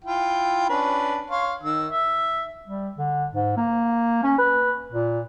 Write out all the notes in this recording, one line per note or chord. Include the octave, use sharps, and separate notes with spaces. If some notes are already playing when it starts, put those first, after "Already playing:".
E4 F4 G5
C#4 D4 B4
C#5 F5 C6
D#3 E6
E5
G3
D3
G#2
A#3
C#4
B4
A#2